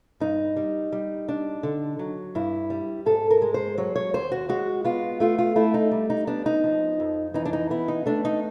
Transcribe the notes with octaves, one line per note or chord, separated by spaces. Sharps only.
G2 D#4
G3
G3
D4
D3
F#3
G2 E4
G3
G#2 A4
A#4
G#3
C5
F#3 C#5
C#5
D#2 C5
F#4
G#3 F#4
B3 F4
A3 F4
F4
A3 E4
D#4
G3
D#4
B3 D4
D#4
F3
F2
E3 D#4
D4
D#4
B3 E4
D#4
A3 D4
D#4